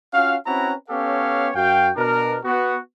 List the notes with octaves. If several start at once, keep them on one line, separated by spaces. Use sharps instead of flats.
C#4 F4 F#4 F5
C4 C#4 E4 F#4 B4 A#5
B3 C#4 G4 A4 C#5 F5
F#2 F#4 F5 G5
B2 D4 A#4
B3 F#4